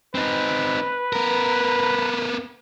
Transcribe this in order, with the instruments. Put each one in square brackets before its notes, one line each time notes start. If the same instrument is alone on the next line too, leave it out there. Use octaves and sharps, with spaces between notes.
[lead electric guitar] C4 D#4 [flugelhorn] B4
[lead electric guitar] B3 A#4